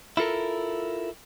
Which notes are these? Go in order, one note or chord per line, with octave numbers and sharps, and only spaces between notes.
E4 F4 A4 A#4